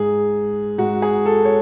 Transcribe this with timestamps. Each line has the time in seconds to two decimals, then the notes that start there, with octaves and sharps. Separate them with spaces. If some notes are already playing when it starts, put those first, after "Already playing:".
Already playing: G#2 G#4
0.78 G#2 F#4
1.02 G#4
1.26 A4
1.45 C#5